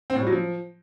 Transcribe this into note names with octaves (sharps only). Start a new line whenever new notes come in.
C4
A2
G3
F#3
F3